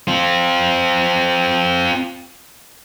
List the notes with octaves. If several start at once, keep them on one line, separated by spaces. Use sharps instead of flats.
C4 F4